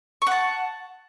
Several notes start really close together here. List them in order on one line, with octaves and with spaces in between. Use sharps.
C#6 F#5 A5